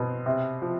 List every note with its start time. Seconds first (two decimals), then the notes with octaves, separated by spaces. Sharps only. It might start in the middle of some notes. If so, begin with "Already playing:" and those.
Already playing: B2 C4
0.26 C3
0.62 F3